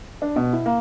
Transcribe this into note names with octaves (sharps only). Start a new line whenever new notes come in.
D4
B2
E4
A#3